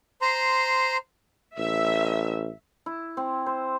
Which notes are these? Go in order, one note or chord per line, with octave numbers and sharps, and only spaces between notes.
C5 A#5 C6
A1 E5
E4
C4
C5